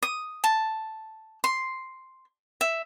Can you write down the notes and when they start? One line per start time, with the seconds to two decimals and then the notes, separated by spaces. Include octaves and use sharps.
0.03 D#6
0.44 A5
1.44 C6
2.61 E5